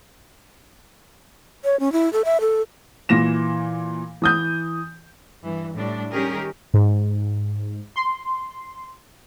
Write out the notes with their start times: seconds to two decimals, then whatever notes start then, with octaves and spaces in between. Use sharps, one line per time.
1.64 C#5
1.80 C#4
1.92 E4
2.13 A4
2.25 E5
2.41 A4
3.09 A#2 E3 A#6 E7
4.22 E3 D#6 G6
5.44 G2 E3
5.76 A2 G3 D4
6.13 D#3 G3 C#4 G4 G#4 A#4
6.74 G#2
7.96 C6